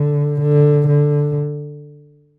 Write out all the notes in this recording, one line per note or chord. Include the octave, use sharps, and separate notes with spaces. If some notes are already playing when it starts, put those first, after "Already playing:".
Already playing: D3
D3
D3